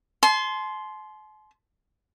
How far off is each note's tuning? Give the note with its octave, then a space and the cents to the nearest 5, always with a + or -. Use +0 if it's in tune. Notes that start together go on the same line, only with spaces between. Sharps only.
A5 -45 C6 +0